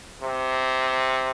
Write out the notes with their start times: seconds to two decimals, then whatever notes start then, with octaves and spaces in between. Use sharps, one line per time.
0.22 C3